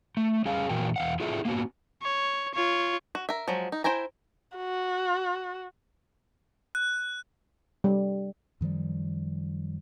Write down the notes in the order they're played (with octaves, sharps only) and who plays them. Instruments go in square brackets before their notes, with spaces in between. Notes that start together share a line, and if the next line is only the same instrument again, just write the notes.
[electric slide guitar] A3
G3 C#4 G#4 F5
A#2 E3 F#4 A#4 G5
E2 F5 F#5
E4 F4 G#4 A4 E5
A#3 B3 C#4 F#4
[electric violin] C#5
F4 C#5
[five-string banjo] F#4
A#4 E5
F3 F#3 G#3
D#4
E4 C5 G5 G#5 A#5
[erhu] F#4
[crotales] F#6
[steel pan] G3
[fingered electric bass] F#2 D#3 F3 G3